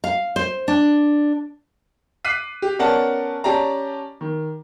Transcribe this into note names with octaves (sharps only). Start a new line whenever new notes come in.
F5
C5
D4
D6 F#6 B6 C7 D#7
G4
B3 C#4 A#4 D5 F#5 A5
C#4 G4 D5 A5 A#5
D#3